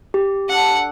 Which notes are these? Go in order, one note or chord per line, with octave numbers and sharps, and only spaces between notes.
G4
D4 A4 F#5